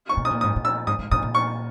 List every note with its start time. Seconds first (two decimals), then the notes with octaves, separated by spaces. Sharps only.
0.09 C#6
0.17 B2
0.25 D#6
0.31 A#2
0.41 G#2 D#6
0.56 A#2
0.65 E6
0.87 G#2 D#6
0.99 G#2
1.11 A#2 D#6
1.23 A#2
1.35 C#6